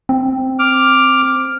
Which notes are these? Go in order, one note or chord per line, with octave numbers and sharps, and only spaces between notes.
C4
D6 F6